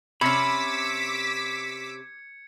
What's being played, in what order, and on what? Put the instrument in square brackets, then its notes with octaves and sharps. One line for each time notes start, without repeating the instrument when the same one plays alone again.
[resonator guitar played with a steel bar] C3 C#4 [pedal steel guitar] B5 [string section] D6 E6 B6 [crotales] G#6 C#7